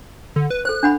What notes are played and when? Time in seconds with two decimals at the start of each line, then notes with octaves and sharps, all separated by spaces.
0.36 D3
0.50 B4
0.65 A4 C5 F#6
0.83 D4 F#5 B5